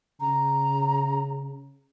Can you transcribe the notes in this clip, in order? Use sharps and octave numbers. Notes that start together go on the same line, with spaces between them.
C#3 A#5